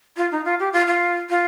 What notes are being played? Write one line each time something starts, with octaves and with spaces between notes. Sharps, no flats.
F4
D#4
F4
G4
F4
F4
F4